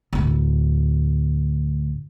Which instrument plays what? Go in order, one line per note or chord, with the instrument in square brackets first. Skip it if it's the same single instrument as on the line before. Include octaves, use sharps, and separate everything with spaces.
[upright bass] D2 A2